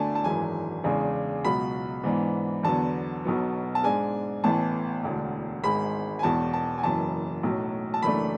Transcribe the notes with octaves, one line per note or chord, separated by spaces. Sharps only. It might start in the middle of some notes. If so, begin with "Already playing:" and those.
Already playing: D2 D3 A3 D4 G#5 A5
A5
G#1 F#2 E3 G#3 D4 G#5
E2 C#3 G#3 D4
C#2 B2 F#3 B5
G#2 E3 B3 D4
E2 D3 F#3 B3 A5
B1 B2 F#3 B3
A5
G#2 G#3 D4 G#5
A1 A2 E3 B3 A5
E1 D2 D3
G#1 G#2 G#3 B5
G#5
E1 E2 B2 A5
A5
G#5
F#1 F#2 E3 A5
B1 A2 F#3
A5
F#1 F#2 E3 A3 D4 B5